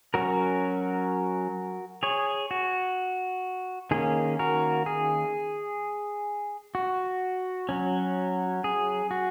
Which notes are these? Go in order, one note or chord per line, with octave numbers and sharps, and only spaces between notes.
F#3 C#4 F#4 A#4
G#4 C#5
F#4
D#3 A#3 C#4 G#4
F#4 A#4
G#4
F#4
F#3 C#4
G#4
F#4